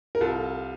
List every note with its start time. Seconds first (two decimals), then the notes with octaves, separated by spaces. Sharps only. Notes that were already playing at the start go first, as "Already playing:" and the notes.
0.15 A#4
0.21 C2 F4 A4